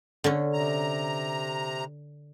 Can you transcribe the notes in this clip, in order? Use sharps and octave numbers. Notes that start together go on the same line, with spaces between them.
D3 C#4
C3 A#5